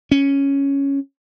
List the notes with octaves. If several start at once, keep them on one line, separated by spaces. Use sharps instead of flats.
C#4